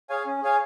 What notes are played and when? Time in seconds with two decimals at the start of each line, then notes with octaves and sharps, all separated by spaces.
0.10 G#4 C#5 F5 G#5
0.26 C#4
0.42 G#4 C#5 F5 G#5